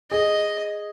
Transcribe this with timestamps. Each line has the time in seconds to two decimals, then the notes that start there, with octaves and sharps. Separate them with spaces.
0.11 G#4 D#5